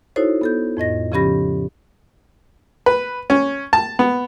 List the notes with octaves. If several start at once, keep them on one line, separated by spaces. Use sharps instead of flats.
D#4 E4 F#4 A4 C5 C#5
B3 A4 G6
F2 A2 D#5 A#6
C#3 F3 C#4 G4 B5 A#6
B4
C#4
A5
B3